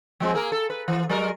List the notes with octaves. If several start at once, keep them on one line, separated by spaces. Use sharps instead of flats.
F3 G#3 C4
A#3 G#4 A#4
A4
B4
E3
F#3 G#3 A#4